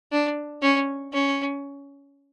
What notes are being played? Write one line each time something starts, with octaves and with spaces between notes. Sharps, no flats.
D4
C#4
C#4